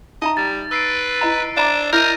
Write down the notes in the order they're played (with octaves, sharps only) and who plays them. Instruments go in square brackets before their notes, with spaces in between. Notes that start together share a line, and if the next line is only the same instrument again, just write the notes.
[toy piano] D#4 E5 A#5 [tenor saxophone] D#5
[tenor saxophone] G3 [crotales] A6
[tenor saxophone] B4 [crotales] E6 C7 D7
[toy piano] E4 D#5 A#5
[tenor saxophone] D4 [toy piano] E5 A#5 D6
[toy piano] E4 D#5 E5 [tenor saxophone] A#4 [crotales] G6 A#6 D#7